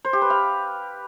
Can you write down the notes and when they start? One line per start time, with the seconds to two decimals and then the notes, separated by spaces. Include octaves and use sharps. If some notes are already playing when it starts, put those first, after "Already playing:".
0.05 C5
0.13 G4
0.22 B4
0.30 F5